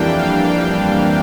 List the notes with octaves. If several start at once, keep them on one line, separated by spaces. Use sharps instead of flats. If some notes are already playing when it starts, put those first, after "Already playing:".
Already playing: F2 E3 G3 A#3 D4 G5
F5
G5